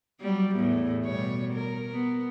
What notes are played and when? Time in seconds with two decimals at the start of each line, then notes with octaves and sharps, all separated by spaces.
0.21 F#3 G3
0.56 E2 A2
1.05 B2 G3 C#5
1.53 A#4
1.92 B3